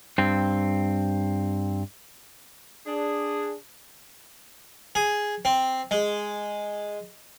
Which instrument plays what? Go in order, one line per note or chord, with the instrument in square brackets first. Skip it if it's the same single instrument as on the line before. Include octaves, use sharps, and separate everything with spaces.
[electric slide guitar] G2 C4
[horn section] D4 G#4
[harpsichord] G#4
C4
G#3